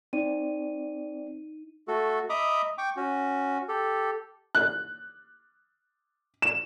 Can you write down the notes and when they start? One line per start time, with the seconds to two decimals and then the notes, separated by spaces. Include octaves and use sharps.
0.13 C4 D#4 D5 D#7
1.88 A3 F#4 A4
2.30 D#5 E5 A#5 B5 D6 D#6
2.78 G5 C#6 D6
2.96 C#4 F#4
3.68 G4 A4
4.55 F#6
6.42 E7